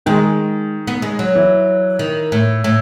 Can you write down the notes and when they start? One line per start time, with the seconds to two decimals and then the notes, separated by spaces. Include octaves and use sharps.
0.06 D#3 G#3
0.87 B3
1.02 G#3
1.19 F#3
1.35 E3
1.99 D#3
2.32 A2
2.64 A2